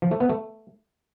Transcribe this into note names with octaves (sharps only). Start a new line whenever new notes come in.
F3
A3
B3
A3